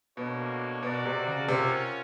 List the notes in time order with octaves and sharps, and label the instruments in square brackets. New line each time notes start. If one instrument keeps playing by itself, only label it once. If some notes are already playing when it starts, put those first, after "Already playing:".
[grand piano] B2 [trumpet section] A#3 D4 F#4 A4 C#5
[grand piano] B2 [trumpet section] F#4 A#4 D5 F#5
[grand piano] C3
C#3
[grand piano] C3 [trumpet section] C#4 F4 A#4 C#5 F#5